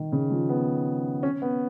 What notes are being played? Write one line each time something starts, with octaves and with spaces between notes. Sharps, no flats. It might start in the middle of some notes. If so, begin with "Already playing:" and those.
Already playing: D#3
C#3
F3
B3
C#4
B3